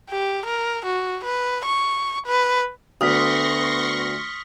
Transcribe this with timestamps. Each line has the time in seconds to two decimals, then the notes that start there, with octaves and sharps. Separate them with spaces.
0.10 G4
0.45 A#4
0.85 F#4
1.24 B4
1.65 C#6
2.26 B4
3.01 D2 B3 C6 C#6 D#6 F6 A#6 B6